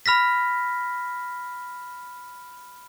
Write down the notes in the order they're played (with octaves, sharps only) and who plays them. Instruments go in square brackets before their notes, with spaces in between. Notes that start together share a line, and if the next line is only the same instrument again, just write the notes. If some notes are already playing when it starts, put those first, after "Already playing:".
[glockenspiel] B5 F6 A#6 B6